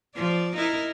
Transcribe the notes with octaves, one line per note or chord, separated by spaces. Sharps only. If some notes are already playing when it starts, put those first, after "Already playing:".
F3 D5
D#4 E4 A#4